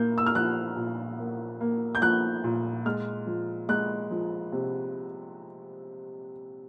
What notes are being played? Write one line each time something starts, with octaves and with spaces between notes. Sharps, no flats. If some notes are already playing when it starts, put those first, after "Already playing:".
Already playing: A#2 A#3 G6
E6
F6
F3 F#6
A#2
A#3
A#3
G6
F3 F#6
A#2
G#3 F6
F3
G#3 F#6
F3
C3